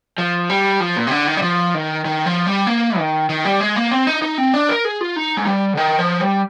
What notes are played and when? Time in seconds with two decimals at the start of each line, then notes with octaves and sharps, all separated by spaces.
0.18 F3
0.50 G3
0.80 F3
0.97 A#2
1.07 C3
1.11 D3
1.27 D#3
1.37 G3
1.42 F3
1.74 D#3
2.05 D#3
2.26 F3
2.47 G3
2.67 A#3
2.98 D#3
3.29 D#3
3.45 G3
3.60 G#3
3.76 A#3
3.91 C4
4.07 D#4
4.22 D#4
4.38 C4
4.54 D4
4.69 A#4
4.85 G#4
5.01 F4
5.16 D#4
5.37 G#3
5.47 G3
5.74 D3
5.77 D#3
5.99 F3
6.19 G3